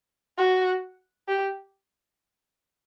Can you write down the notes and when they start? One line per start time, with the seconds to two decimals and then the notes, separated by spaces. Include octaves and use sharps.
0.38 F#4
1.28 G4